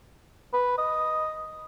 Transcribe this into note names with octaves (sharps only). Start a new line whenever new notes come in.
B4
D#5